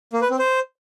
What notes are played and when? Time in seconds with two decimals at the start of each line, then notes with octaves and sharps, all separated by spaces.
0.13 A#3
0.22 B4
0.30 C4
0.39 C5